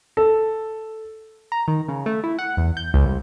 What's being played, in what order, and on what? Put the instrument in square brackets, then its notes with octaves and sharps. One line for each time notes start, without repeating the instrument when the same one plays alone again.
[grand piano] A4
[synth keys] A#5
D#3
C#3
A3
E4
F#5
E2
G6
C#2
C2